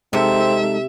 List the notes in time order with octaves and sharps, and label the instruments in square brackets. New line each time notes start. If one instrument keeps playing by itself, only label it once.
[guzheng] C3 [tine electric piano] G#3 D#4 A4 [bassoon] C4 [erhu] E5